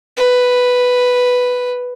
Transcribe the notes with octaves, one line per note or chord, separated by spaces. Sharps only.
B4